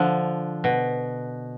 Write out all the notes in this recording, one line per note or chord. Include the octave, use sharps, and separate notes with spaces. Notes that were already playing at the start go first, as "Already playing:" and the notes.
Already playing: D3 F3
B2